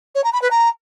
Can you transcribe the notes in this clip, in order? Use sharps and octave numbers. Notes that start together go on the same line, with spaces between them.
C#5
A#5
B5
B4
A#5